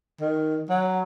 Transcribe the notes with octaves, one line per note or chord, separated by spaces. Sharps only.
D#3
F#3